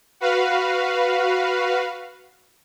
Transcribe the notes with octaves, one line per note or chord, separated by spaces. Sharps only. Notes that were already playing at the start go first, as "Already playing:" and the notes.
F#4 B4 F5